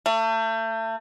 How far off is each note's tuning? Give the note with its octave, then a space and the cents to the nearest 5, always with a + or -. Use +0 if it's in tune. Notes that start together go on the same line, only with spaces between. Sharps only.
A3 +35